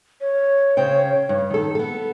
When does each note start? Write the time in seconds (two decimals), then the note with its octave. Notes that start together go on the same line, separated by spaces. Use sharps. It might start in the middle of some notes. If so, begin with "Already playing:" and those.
0.21 C#5
0.77 C#3 C5 G5
1.29 G2
1.50 D#3 A4
1.75 B3 A4